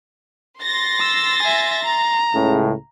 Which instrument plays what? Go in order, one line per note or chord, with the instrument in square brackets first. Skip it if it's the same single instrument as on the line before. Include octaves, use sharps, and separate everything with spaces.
[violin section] C6 A6 A#6
[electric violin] E6
E5 G#5
A#5
[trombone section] C#2 A2 C#3